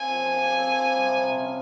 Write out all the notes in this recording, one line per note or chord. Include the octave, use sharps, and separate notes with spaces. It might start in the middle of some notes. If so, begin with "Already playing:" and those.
Already playing: A#3 C4 G#5
F3
F3
G4
C4
F3
G3
C3
C3
C#4